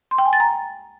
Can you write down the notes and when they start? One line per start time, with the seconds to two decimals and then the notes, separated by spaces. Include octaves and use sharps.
0.11 C6
0.18 G5
0.26 G#5
0.33 A6
0.40 A#5